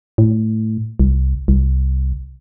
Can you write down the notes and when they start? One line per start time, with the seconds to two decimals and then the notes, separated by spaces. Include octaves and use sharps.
0.18 A2
1.00 C2
1.48 C2